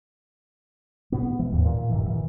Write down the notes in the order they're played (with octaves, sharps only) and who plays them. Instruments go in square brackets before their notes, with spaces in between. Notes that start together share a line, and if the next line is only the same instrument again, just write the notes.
[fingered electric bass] B2 B3
E3 G#3
D#2 G#2
A#2
G2 D#3 E3
A#2 E3